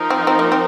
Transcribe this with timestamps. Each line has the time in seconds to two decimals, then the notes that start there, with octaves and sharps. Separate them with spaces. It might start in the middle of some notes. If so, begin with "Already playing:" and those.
Already playing: F3 D#4 A#4
0.10 C4
0.27 C4
0.39 A#3
0.52 C4